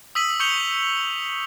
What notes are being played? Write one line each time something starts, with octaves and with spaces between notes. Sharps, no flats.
D#6 E6 B6 D#7 F#7
C#6 D#6 G6 C#7 F7 G7